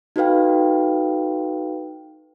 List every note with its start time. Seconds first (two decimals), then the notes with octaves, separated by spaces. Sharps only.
0.16 D#4 F#4 A4 B4 F5 G5